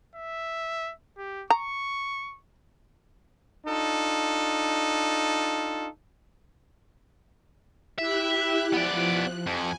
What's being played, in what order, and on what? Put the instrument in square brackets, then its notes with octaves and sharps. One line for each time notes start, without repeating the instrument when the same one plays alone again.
[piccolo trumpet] E5
G4
[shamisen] A#5 [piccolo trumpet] C#6
[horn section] D4 D#4 F4 A4
[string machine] E4 G4 F#6 [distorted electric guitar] E5
[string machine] F3 F#6 [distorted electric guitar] B3 D5
[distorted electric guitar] F2 [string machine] G#5